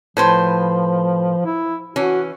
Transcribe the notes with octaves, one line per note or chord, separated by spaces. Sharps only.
A2 F3 B4 C5
E4
E3 C#4 F#4